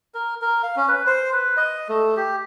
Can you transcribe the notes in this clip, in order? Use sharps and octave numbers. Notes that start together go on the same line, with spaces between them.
A#4
A#4
F5
C#4
B4
C5
B4
D#5
A3
G4